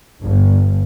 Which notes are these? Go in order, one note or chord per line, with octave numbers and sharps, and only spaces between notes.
G1